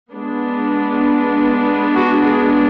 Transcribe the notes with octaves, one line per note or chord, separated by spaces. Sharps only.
G#3 B3 D4
F#4
G#4